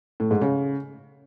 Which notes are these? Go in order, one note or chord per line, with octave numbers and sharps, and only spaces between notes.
A2
G#2
C#3